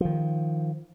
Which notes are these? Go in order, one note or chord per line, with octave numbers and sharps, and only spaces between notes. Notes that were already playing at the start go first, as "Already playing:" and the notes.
D#3 F3